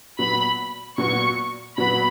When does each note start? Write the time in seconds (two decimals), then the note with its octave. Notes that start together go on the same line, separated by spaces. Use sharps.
0.19 A#2 F#3 B3 F#4 B5
0.98 A#2 F#3 B3 F#4 C#6
1.77 A#2 F#3 B3 F#4 B5